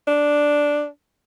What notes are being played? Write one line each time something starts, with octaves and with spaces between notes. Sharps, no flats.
D4